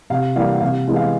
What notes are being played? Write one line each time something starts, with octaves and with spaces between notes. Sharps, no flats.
C3 F5
E3 G3 A#3 F5
F#5
C3 F5
E3 G#3 B3
F5